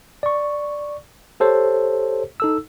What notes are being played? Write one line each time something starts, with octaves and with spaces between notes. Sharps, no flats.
D5 C#6
G4 A4 C5 C#5
D#4 A4 E6